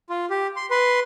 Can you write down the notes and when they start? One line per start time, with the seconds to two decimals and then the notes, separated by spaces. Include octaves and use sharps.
0.10 F4
0.30 G4
0.56 C6
0.71 B4 C6